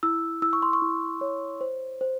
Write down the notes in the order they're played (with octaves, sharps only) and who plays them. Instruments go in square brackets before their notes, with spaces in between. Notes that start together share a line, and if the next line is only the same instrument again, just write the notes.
[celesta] E4 E6
E4 E6
C#6
C6
C#6
E4
C#5
C5
C5